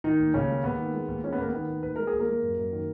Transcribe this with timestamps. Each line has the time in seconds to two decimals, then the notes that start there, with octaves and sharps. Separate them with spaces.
0.04 D#3 D#4
0.19 D#2
0.34 D#2 C#3 C#4
0.48 G#3
0.64 D#2 B3
0.79 D#3
0.94 G#3
1.08 D#2
1.23 G#3 C#4
1.32 B3
1.38 D#2 A#3
1.49 D#3 B3
1.68 D#3
1.83 D#2 B4
1.96 G#3 A#4
2.07 G#4
2.13 D#2
2.20 A#3 A#4
2.28 G#3
2.42 F#2
2.58 F#2
2.72 D#3